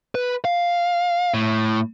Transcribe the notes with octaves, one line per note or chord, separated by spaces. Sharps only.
B4
F5
A2